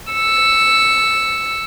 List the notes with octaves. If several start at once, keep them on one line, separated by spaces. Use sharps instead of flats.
E6 C#7